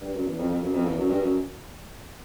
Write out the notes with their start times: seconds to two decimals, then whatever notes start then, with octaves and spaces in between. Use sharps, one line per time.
0.01 G2
0.14 F#2
0.25 E2
0.38 F2
0.50 F2
0.61 F#2
0.73 F2
0.85 E2
0.97 F#2
1.09 G2
1.21 F#2